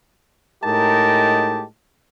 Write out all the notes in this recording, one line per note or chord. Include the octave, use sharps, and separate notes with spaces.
A2 G#3 D#4 G4 A#4 A5